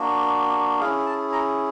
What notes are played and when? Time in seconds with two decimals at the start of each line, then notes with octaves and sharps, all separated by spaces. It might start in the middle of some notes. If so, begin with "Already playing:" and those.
Already playing: A#3 D4 F#4
0.80 C#4 E4 G#4 F5
1.06 A5
1.32 A#5